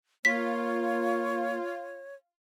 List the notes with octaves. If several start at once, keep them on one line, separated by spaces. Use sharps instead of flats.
A#3 F4 C#5 B6